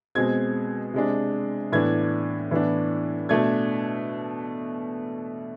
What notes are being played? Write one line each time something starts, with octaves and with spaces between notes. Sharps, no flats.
B2 G#3 C4 G#6
C3 G#3 D4
A2 E3 B3 D4 G#6
A2 E3 B3 D4
B2 A3 D4 G#6